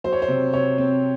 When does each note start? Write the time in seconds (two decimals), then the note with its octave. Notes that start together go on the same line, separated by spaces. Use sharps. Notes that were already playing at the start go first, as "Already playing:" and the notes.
0.04 F#3 C5
0.12 C#5
0.22 C5
0.28 C3
0.53 C3 C#5
0.78 C4